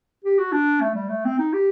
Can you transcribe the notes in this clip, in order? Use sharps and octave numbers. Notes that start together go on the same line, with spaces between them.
G4
F#4
D4
A3
G3
A3
C4
D#4
G4